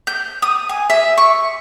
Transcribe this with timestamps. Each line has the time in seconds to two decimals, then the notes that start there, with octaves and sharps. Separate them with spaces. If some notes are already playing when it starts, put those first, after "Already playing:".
0.07 G6
0.42 D#6
0.69 G#5
0.90 E5
1.18 C#6